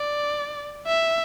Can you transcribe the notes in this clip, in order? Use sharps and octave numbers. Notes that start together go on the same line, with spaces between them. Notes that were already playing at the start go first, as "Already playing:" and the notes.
Already playing: D5
E5